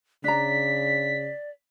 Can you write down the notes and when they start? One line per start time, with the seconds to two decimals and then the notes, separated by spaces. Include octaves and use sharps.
0.24 C#3 D4 D5 A#5 B6